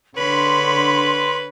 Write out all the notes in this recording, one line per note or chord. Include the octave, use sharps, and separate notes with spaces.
D3 D4 B4 C#5 B5 C6